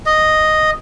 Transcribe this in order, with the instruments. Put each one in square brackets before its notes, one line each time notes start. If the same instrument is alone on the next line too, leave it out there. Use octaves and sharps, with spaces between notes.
[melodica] D#5